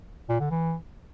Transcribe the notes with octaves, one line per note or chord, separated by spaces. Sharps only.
A#2
D3
E3